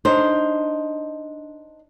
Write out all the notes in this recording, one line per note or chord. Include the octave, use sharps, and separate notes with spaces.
D4 D#4 C5